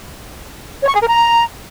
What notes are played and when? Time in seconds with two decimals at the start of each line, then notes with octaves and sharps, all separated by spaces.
0.82 C#5
0.88 C#6
0.95 G#4
1.01 A#4
1.07 A#5